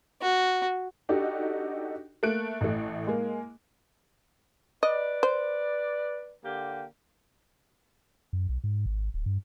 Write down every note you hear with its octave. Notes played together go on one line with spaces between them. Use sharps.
F#4
D4 D#4 F#4 G4 A4
A3 A#3 F#6 D7
A1 A3
G#3 A#3
B4 D5 D#5
C5
D3 A#3 G4
F#2
B1
G#2
G#1
D1
G2